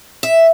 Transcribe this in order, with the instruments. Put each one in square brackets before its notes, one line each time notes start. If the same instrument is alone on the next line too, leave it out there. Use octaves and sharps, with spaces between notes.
[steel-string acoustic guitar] E5